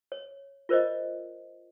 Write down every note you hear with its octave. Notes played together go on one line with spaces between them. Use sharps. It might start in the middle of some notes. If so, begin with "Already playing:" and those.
C#5
F4 A#4 C5 D5 D#5